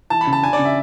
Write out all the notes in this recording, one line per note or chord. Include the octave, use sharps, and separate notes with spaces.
E3 A5
B5
C#3
A5
D4 G#5
D5
C#3
E5